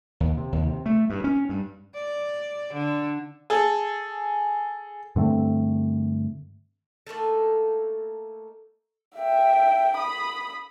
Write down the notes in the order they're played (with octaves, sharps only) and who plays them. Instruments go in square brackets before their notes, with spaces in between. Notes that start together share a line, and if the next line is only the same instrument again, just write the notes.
[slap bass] D#2
C3
D#2
C3
A3
G2
C#4
G2
[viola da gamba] D5
D3
[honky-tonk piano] G#4 A4
[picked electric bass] G2 D3 A3 C4
[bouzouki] A3 A#3 D#4 A4
[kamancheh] E5 G5
B5 D#6